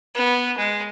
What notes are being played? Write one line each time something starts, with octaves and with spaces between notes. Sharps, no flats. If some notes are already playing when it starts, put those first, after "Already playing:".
B3
G#3